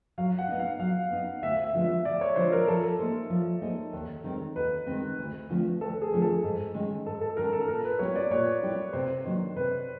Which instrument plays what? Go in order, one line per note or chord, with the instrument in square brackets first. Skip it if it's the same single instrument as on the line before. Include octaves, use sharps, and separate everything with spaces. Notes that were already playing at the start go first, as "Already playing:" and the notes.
[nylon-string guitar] F#3 [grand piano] F5
[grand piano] F#5
[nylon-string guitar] B3 D#4
[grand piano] F5
[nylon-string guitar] F#3 [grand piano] F5
[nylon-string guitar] B3 D#4
[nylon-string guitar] D2 [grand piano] E5
[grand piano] E5
[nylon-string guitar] D3 F3 G#3 B3
[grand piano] E5
[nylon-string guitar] D2 [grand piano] D5
[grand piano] C#5
[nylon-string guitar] D3 F3 G#3 B3 [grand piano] C5
[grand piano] A#4
[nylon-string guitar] F3 [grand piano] A4
[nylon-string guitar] A#3 D#4 G#4 C5
F3
A#3 D#4 G#4 C5
D#2
D#3 G#3 C4
[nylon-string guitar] D#2 [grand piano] B4
[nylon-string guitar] D#3 G#3 C4
D2
D3 F3 A3 C4
[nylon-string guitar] D2 [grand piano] A4
[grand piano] G#4
[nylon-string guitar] D3 F3 A3 C4
[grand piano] A4
[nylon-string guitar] G#2
D#3 G#3 C#4
[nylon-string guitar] G#2 [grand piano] A4
[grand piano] A4
[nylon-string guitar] D#3 G#3 C#4 [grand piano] A#4
[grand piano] A4
[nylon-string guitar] A#2 [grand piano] A#4
[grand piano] B4
[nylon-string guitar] G3 B3 E4 G4 [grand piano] C#5
[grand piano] D5
[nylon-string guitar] A#2 [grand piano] C#5
[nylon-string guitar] G3 B3 E4 G4
[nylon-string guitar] C3 [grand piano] C5
[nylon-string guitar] D#3 F#3 A#3 D4
[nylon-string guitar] C3 [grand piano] B4